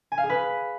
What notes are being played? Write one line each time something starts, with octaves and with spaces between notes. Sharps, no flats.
G#5
F5
G#4
B4